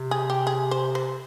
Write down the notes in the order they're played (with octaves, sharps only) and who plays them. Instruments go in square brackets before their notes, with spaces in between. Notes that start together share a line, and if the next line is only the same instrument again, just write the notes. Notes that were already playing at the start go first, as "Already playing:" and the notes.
Already playing: [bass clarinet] C3
[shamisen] G#4
G4
G#4
C5
C5